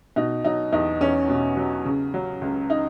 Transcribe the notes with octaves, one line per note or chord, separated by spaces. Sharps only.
B2 D#4
F#3 D#4
E2 D#4
E2 C#4
B2
F#3
C#3
F#3
C#2
D#4